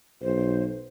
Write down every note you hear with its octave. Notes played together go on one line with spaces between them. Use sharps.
B1 C5